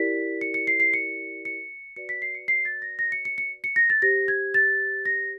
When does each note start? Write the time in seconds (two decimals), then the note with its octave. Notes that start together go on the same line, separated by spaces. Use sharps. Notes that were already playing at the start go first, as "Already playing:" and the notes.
Already playing: E4 G4 A#4 D5 B6
0.41 C#7
0.54 C#7
0.67 C7
0.80 C7
0.94 C#7
1.45 C#7
1.96 F#4 B4 D5 C#7
2.09 B6
2.22 C7
2.35 C#7
2.48 C7
2.65 A6
2.82 A#6
2.99 A#6
3.12 C#7
3.25 C#7
3.38 C#7
3.64 C#7
3.76 A#6
3.90 A6
4.02 G4 C5 A#6
4.28 G#6
4.54 A6
5.05 A#6